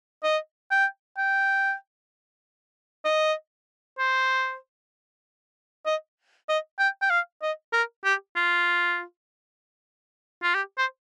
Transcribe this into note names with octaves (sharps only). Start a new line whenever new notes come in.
D#5
G5
G5
D#5
C5
D#5
D#5
G5
G5
F5
D#5
A#4
G4
F4
F4
G4
C5